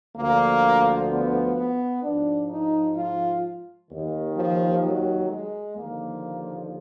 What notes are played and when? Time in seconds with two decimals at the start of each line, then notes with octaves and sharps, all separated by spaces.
0.17 D2 D3 F3 A#3
1.10 B3
1.57 B3
2.03 G#2 F3 D4
2.50 D#4
2.96 F4
3.90 D#2 D#3
4.36 F3
4.83 F#3
5.30 G#3
5.77 D#2 D3 F3 A#3